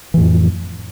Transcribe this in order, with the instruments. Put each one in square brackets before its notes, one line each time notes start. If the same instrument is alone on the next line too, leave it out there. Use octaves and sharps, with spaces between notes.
[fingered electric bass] E3
A2
F2